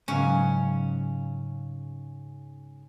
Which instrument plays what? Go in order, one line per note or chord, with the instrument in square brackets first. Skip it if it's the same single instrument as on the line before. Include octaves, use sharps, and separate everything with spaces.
[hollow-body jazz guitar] G#2 C#3 F#3 [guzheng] C#4